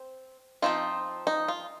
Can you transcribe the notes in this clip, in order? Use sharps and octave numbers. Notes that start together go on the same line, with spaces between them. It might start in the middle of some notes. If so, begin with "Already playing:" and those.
Already playing: C4
F3 C4 D#4 F4
D#4
F4